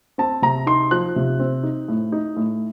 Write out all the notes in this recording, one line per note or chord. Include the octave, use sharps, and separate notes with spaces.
C4 A5
C3 A#5
D#4 C6
F3 F#6
C3
C4
D#4
A2
D#4
A2